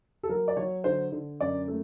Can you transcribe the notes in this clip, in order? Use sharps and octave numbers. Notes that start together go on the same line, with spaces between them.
A4
F#3 A#4
D5
F#3 C#5
D3 C5
D3
F#2 D5
A3